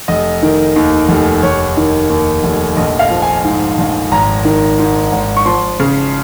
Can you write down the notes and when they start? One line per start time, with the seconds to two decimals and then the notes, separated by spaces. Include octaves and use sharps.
0.08 F1 D#5
0.43 D#3
0.76 D#2
1.09 F1
1.43 F1 C#5
1.77 D#3
2.10 D#2
2.44 F1
2.77 A#1 D#5
2.99 F5
3.10 F3
3.22 G#5
3.44 G#2
3.78 A#1
4.11 G#1 A#5
4.45 D#3
4.79 G#2
5.12 G#1
5.37 C#6
5.45 F3 C6
5.80 C#3